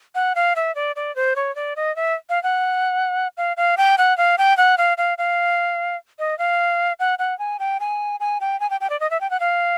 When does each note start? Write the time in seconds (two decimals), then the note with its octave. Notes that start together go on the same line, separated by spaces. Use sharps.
0.15 F#5
0.35 F5
0.56 E5
0.75 D5
0.96 D5
1.16 C5
1.36 C#5
1.56 D5
1.76 D#5
1.96 E5
2.29 F5
2.43 F#5
3.37 F5
3.57 F5
3.77 G5
3.98 F#5
4.18 F5
4.38 G5
4.57 F#5
4.78 F5
4.98 F5
5.18 F5
6.19 D#5
6.39 F5
7.00 F#5
7.19 F#5
7.39 G#5
7.59 G5
7.80 G#5
8.20 G#5
8.41 G5
8.60 G#5
8.70 G5
8.81 G5
8.90 D5
9.00 D#5
9.11 E5
9.21 G5
9.30 F#5
9.40 F5